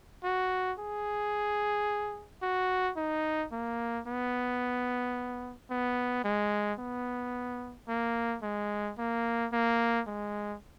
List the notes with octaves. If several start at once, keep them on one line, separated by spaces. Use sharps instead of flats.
F#4
G#4
F#4
D#4
A#3
B3
B3
G#3
B3
A#3
G#3
A#3
A#3
G#3